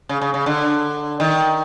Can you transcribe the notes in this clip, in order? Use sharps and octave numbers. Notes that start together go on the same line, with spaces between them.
C#3
C#3
C#3
D3
D#3